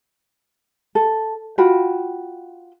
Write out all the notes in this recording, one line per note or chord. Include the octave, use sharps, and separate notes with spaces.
A4
F4 F#4 G5 B5